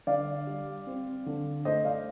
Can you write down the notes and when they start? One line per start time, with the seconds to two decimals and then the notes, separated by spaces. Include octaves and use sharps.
0.07 D3 D5 F5
0.47 G3
0.87 C4
1.26 D3
1.65 A3 C5 D#5
1.85 D5 F5